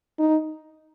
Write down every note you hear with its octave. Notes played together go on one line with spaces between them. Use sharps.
D#4